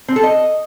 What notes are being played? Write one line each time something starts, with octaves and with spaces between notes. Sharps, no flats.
C4
A4
D#5